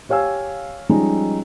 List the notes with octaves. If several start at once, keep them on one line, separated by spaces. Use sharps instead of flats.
G4 C#5 F5 G#5 E6
F3 G3 G#3 C#4 D#4